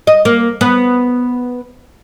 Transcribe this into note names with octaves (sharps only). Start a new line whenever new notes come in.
D#5
A#3
B3